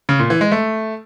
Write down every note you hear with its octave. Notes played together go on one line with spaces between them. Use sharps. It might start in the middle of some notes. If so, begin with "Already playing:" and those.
C#3
A#2
E3
G#3
A3